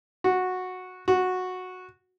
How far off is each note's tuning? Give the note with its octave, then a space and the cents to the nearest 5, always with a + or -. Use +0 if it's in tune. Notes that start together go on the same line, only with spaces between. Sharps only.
F#4 -10
F#4 -10